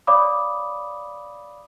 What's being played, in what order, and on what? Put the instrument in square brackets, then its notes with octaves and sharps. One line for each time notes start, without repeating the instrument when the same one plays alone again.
[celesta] C#5 D5 F5 B5 D6 D#6